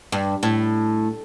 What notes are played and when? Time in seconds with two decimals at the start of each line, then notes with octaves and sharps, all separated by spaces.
0.12 G2
0.43 A2